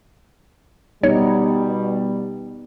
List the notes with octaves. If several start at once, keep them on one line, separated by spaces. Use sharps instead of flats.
B2 G3 B3 D#4 C#5